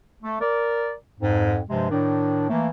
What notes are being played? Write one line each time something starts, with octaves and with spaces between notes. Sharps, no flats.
A3
A#4 D5
F2 G#2
G2 C3 F3 G#3
A2 D#3 D4
E3 A3 A#3